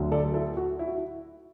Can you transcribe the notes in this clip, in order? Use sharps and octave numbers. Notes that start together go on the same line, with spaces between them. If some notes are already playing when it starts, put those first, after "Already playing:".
Already playing: D2 D3 F#3
A4 D5
E4 A4
F#4
E4
F#4
E4